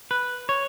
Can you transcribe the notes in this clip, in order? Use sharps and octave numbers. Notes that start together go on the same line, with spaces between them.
B4
C#5